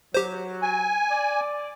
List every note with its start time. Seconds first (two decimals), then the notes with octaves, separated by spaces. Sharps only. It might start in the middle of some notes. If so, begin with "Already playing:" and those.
0.14 F#3 G4 C5
0.62 G#5
1.10 D5